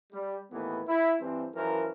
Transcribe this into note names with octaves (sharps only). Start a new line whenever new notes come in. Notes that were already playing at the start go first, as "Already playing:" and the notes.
G3
D#2 A2 E3 B3
E4
G2 E3 C4
F#2 E3 F3 A#4